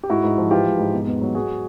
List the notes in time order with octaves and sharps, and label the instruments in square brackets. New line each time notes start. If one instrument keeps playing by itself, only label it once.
[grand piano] G4
G#2 E4 F#4
G#2
F3
E3 F4 G4
G#2
G#2
B2
E2
F#3
F#3 F#4 G#4